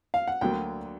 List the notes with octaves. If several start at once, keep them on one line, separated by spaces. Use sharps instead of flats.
F5
F#5
D2 D3 F#3 A#3 G5